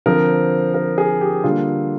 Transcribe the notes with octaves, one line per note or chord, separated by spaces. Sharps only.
D3 F3 C4 A#4
A#4
G#4
G4
D3 G3 A#3 F4